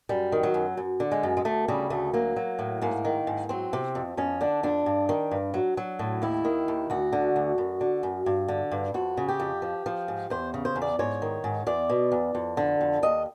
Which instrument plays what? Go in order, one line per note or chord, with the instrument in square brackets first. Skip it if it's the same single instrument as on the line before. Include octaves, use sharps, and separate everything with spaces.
[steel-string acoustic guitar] F#2 G3
D#3
F#3
F#2
F#2
D3
G#3
F#2
G#3
D2 A3
C#3 G3
D2 A3
F#3 A#3
F#3
A2
G#2 A#3
D#3
G#2
F#3 C4
C3
F2
F2 C#4
D3 D4
F2 D4
G2
D#3
G2
F#3
F#3
A2
D#2 E4
D#3
D#2
D2 F#4
D3
D2
F#2
D3
F#2
G2
D3
G2
F2 F#4
C#3
G4
F2
F3
F3
G#2
E2 C5
C#3
C5
E2
D5
G#2 C#5
D#3
G#2
E2 D5
B2
E2
F2
D3
F2
D#2 D#5